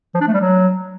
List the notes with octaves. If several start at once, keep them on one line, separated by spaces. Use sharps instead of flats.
F3
D4
A3
G3
F#3